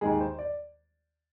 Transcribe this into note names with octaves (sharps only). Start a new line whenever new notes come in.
D#2 D#3 G#3 G#4
C5
D5